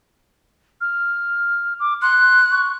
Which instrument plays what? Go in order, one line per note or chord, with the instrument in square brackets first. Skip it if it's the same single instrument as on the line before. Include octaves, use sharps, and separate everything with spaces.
[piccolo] F6
D6
[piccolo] C6 [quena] F#6
[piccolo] C#6